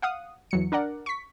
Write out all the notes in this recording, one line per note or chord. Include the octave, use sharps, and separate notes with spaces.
F5 F#5 D#6
E2 F#3 C#7
D4 A#4 D5 F#5
C#6 B6